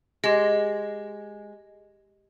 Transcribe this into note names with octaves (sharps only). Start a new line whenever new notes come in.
G#3 G4 D#5